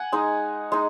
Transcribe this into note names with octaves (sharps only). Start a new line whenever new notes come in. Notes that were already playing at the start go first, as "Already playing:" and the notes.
Already playing: F#5 G#5
G#3 D#4
G#3 D#4